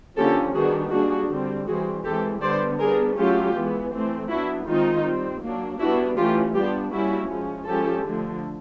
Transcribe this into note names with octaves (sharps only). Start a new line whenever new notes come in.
D3 F3 A#3 C#4 G4 A4
D#3 G3 B3 D4 F#4 G#4
G3 A#3 D4 F#4 G#4
D3 G3 C4
E3 G3 C4 F#4 G#4
E3 G#3 C4 G4 A4
D3 G3 B3 C5 D5
G3 B3 D4 G#4 A#4
F#3 A3 C#4 F4 G4
E3 G#3 B3
E3 A3 C4
F#3 B3 D4 E4 F#4
D#3 G#3 C4 D#4 F4
G3 C4
F#3 A#3 D4
G3 B3 D4 E4 F#4
E3 A3 C#4 F4 G4
G3 B3 D4 F4 G4
G3 A#3 C#4 E4 F#4
F3 G#3 C#4
F3 G#3 C#4 G4 A4
D3 F3 A3